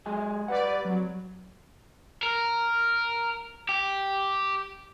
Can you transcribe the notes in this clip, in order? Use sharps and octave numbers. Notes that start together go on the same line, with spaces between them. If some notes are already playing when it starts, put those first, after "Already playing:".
F#3 G#3 G#5
G3 B4 D5 F#5
C2 F#3
A#4
G4